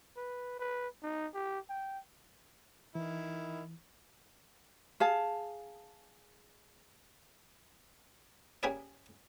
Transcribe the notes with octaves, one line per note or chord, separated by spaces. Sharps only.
B4
B4
D#4
G4
G5
D#3 E3 E4
G#4 F5 A5
A#3 C#4 G4 G#4 B4 D5